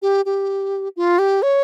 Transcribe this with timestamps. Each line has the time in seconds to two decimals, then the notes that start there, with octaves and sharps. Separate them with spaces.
0.02 G4
0.25 G4
0.96 F4
1.19 G4
1.42 C#5